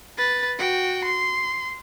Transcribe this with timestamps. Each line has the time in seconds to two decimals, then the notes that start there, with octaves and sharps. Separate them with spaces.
0.17 B4 A6
0.59 F#4 G5
1.04 C6